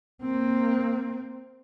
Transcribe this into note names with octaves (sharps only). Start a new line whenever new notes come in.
A#3 C4